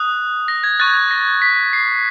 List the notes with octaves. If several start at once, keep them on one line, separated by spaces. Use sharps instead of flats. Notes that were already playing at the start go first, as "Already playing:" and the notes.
Already playing: D#6 F#6
A#6
G#6
C#6 F#6 A6
A#6
B6
C7